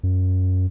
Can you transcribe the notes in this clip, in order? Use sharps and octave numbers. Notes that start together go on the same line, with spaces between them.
F#2